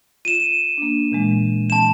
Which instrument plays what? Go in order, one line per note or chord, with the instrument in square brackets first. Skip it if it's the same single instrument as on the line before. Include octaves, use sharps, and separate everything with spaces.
[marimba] F4 [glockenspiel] D#7 E7
[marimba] A#3 D4
A#2 E3 G#3
[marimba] E3 C4 [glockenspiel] A5 E7